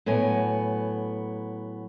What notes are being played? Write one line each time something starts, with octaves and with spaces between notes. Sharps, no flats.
A2 F#3 B3 G#5